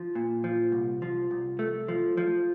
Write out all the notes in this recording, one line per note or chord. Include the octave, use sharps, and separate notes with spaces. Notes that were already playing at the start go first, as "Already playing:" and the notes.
Already playing: F3
A#2
F3
C2
F3
C2
A3
F3
F3